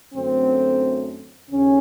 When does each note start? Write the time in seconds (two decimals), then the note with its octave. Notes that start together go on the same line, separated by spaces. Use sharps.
0.13 F#2 D3 F#3 A3 C4
1.49 D#2 C#3 C#4